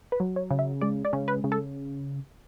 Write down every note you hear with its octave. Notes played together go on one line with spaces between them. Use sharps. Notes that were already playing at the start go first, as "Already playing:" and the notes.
B4
F#3
C#5
C#3
E5
G#3 D5
D5
C#3
B4
C#3
A4